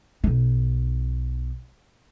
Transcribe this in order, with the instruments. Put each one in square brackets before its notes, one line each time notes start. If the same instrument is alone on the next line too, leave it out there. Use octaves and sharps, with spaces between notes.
[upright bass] B1 D#4